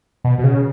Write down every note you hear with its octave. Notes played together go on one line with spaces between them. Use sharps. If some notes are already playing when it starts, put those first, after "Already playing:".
B2
B2
C#3